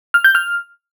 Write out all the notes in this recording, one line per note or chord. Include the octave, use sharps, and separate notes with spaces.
F6
G6
F6